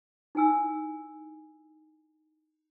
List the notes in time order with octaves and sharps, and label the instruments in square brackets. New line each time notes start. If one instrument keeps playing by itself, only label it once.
[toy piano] D#4 E4 G#5 E6